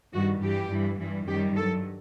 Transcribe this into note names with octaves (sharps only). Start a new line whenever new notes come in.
G2 D#3 G3 F#4
G2 E3 G3 G4
G2 E3 G3
G2 E3 G3
F#2 D#3 G3 G4
G2 F#3 A4